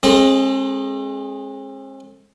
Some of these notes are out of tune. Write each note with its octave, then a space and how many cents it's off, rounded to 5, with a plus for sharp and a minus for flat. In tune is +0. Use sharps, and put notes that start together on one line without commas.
G#3 +5 C4 +45 A4 +30